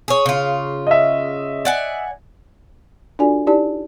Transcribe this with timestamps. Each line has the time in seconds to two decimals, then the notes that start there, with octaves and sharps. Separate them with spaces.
0.08 G#4 C#5
0.26 C#3 F4
0.87 D#5 E5
1.65 D5 F#5 G#5
3.19 D4 F4 F#4 A4 D5 G#5
3.47 D#4 E4 G4 D5 A5